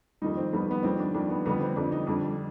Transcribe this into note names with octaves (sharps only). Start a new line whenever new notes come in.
F2 D#3 G3 D#4
C4
F2 D#3 G3 B3
B3
F2 D#3 G3 C4
D4
F2 D#3 G3 D4
B3
F2 D3 G3 B3
C4
F2 D3 G3 D4
D#4
F2 D3 G3 D4